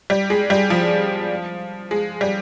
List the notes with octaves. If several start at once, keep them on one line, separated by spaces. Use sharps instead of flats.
G3
G#3
G3
F3
G#3
G3